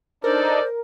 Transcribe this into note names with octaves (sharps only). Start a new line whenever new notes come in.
D4 D#4 A4 A#4 C5 D5